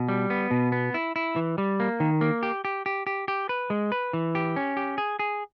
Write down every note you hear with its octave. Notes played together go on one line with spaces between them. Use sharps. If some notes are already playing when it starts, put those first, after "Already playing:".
Already playing: B2
G3
B3
B2
B3
E4
E4
E3
G3
A#3
D#3
A#3
G4
G4
G4
G4
G4
B4
G#3
B4
E3
G4
C#4
G4
G#4
G#4